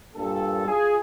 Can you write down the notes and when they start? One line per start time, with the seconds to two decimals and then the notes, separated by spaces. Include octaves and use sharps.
0.16 G2 A#2 A4
0.67 F4 G#4